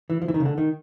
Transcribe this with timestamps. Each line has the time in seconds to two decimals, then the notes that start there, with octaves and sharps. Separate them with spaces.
0.10 E3
0.22 F3
0.28 E3
0.34 D#3
0.40 C#3
0.45 D3
0.58 D#3